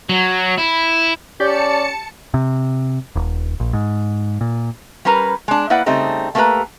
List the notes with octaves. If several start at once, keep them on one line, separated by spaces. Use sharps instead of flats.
F#3
E4
C#4 G4 D5 A5 C#7
C3
D#1
A#1
G#2
A#2
G3 C#4 A#4 B4 A#5
G#3 D4
A#3 E4 B4 D5 F#5
C#3 G3 A3 C4 D#4
A3 A#3 D4 G4 B4 A#5